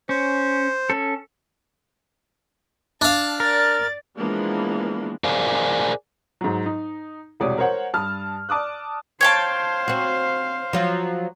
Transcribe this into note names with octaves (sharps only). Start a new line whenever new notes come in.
C#4 C5
C#4 A4
D4 F5 A5
A#4 D5 A6
E3 F3 G#3 A#3 B3 D4
G#4 A#4 C5 D5 F5 G#5
G#2 F#3
D#4
E1 C2 G#3 C#5 D5 D#6
A#4 C5 C#5 F#5
G2 A5 D#6 F6
D5 A5 D6 D#6 F#6
C5 C#5 F5 G5 A5
C4 F#4
F3 F#3 F4